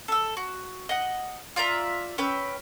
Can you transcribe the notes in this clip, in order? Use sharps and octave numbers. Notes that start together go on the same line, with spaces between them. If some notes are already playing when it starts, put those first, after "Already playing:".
A4 E6
F#4
D#5 F#5
F4 D5 E5 A#5
C#4 B4 G5 E6